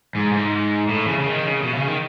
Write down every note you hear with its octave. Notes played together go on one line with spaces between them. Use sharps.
G#2
G#2
A2
C#3
C#3
D#3
C#3
B2
C#3
D#3